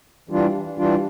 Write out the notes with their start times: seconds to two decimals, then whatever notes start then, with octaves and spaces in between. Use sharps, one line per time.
0.29 E3 G3 D4 F4
0.78 E3 G3 D4 F4